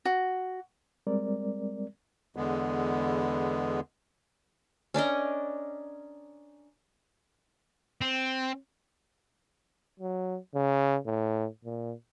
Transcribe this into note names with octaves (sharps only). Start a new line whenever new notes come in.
F#4
G3 G#3 C4 A#4 D5
E2 D3 G#3 B3
C#4 D4 A#4 D#5
C4
F#3
C#3
A2
A#2